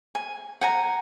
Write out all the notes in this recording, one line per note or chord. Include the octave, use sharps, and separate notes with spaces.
G#5
F#5 G#5 A#5